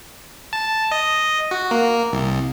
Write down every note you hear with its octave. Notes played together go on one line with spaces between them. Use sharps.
A5
D#5
F#4
A#3
C2